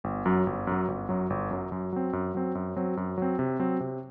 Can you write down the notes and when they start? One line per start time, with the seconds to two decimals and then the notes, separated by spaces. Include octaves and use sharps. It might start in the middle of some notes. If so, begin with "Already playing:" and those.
0.04 G1
0.25 F#2 F#3
0.47 G1
0.67 F#2 F#3
0.88 G1
1.09 F#2 F#3
1.30 G1
1.51 F#2 F#3
1.72 F#2
1.93 F#3 C4
2.13 F#2
2.34 F#3 C4
2.55 F#2
2.76 F#3 C4
2.97 F#2
3.18 F#3 C4
3.39 C3
3.59 F#3 C4
3.80 C3